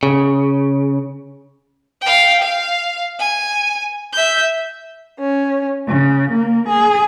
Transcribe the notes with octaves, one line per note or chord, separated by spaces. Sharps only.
C#3
F5 G5
F5
G#5
E5 G6
C#4
C#3
A#3
G#4